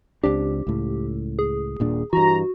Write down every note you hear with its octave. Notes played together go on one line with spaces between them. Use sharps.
C#2 C4 D4 G4
C#2 A2
G#4
D#1 A#2 D4
G2 E3 F#4 A#5